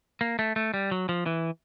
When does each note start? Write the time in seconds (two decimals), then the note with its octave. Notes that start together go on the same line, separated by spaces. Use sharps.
0.21 A#3
0.39 A3
0.56 A3
0.74 G3
0.91 F#3
1.09 F3
1.26 E3